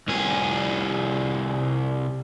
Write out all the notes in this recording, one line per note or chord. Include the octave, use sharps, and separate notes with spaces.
C2 G#4